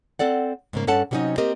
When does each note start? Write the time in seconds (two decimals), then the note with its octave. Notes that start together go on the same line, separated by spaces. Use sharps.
0.19 C4 A4 D5 F#5
0.73 G#2 C#3 A#3
0.87 G2 C#4 A4 F#5 A5
1.11 C3 F#3 G3 C#4 D#4 D#5
1.38 A#3 C4 G4 A#4 D#5